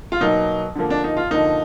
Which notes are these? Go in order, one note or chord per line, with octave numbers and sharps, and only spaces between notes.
F4
B2 F#3 A#3 D#4
D3 F3 A#3
D4
D#4
F4
D3 F3 A#3 D#4